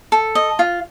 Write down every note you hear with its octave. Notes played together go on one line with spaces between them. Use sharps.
A4
D#5
F4